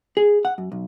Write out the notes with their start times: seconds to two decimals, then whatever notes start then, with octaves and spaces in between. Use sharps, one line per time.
0.17 G#4
0.45 F#5
0.58 F#2
0.72 B1